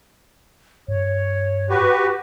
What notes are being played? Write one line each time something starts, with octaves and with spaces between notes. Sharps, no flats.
G2 C#5
F#4 G4 B4 C#6